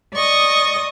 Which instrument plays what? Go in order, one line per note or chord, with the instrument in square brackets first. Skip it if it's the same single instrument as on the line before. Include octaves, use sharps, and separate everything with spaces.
[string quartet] D5 D#5 C#6 D#6